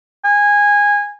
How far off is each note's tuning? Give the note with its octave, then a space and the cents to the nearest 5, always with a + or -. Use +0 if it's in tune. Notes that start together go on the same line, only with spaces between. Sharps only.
G#5 -15